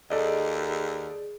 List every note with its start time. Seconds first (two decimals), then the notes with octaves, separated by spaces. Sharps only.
0.10 D#2 G#4 A4 D5 D#5